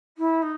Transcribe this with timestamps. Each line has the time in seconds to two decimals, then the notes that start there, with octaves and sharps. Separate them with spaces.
0.17 E4
0.42 D#4